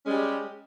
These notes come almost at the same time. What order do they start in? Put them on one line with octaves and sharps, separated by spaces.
C#4 G#3 G3 G4